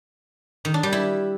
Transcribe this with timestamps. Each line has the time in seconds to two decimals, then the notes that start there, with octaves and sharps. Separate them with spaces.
0.65 D#3
0.74 D4
0.83 G3
0.93 E4